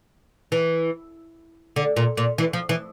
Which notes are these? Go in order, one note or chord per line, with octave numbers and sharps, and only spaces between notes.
E3
D3
A#2
A#2
E3
F3
E3